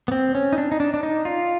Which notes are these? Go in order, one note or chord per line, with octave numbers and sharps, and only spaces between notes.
B3
C4
C#4
D#4
D4
D#4
D4
D4
D#4
F4